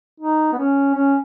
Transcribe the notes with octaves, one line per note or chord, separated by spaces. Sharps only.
D#4
B3
C#4
C#4